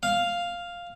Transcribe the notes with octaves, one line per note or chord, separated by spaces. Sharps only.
F5